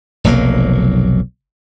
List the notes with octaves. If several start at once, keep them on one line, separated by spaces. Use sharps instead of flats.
F1 B1 F#3 A#3